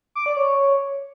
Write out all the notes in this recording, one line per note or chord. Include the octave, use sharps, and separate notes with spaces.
D6
D5
C#5